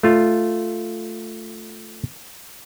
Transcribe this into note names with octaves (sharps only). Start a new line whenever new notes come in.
A3 F4